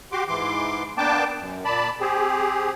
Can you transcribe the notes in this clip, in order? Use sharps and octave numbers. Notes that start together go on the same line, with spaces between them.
F#4 G4 C6 D6
G#2 E3 C6 D6
A#3 B3 D4 G5 A5 D6
F#2
A#2 D5 A5 B5
C4 G4 G#4